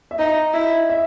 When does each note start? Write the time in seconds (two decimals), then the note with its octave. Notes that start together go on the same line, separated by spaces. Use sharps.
0.11 E5
0.19 D#4 D#5
0.53 E4
0.90 E5